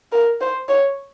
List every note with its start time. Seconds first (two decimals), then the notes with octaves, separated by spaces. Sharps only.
0.12 A#4
0.41 C5
0.69 C#5